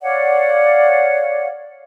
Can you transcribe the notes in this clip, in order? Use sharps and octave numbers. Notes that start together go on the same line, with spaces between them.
C#5 D5 F5 F#5